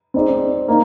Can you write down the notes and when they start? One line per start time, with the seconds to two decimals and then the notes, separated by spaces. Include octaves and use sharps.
0.14 C4 D#4 G#4 D5
0.68 A#3 D#4